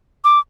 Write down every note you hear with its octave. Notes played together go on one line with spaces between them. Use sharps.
D6